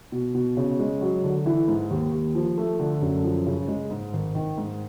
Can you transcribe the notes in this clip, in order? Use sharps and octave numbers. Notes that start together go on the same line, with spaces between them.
B2
B2
C#3
G#3
F#3
D3
E3
G#2
D#2
D#2
F3
A3
D3
F#2
F3
C#3
G#3
G#2
G#1
D#3
G#2